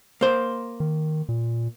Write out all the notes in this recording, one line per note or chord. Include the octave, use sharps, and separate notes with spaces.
A#3 C5
D#3
A#2